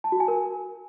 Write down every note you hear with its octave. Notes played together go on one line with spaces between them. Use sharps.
A5
F#4
G#5
A#4